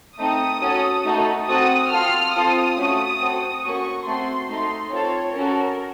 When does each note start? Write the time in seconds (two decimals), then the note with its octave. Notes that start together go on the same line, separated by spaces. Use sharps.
0.18 A3 C4 D#4 A4 D#6
0.62 C#4 F#4 A4
1.04 A3 D#4 F#4 A4
1.48 C4 F#4 A4 D#6
1.91 C4 F4 A4 F6
2.34 C4 F4 A4 D#6
2.77 A3 C#4 F#4
3.20 C4 F#4 A4
3.64 A#3 C#4 F#4 A4 C#6
4.06 A3 C4 F#4 A4 C6
4.49 A3 D#4 A4 C6
4.92 C4 F4 A4 C#5
5.35 C#4 F#4 A4 A#4